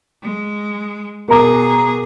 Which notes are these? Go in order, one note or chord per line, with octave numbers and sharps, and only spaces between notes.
G#3
B2 G#4 A#4 A#5 D6